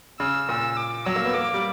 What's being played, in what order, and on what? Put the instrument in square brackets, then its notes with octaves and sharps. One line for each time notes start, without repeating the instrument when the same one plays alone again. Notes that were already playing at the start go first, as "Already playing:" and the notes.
[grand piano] C#3 [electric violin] E6
[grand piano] A#2 [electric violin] E6
[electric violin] D6
[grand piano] F#3 [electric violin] E6
[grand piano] A#3
B3
[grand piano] A#3 [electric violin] D6
[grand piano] G3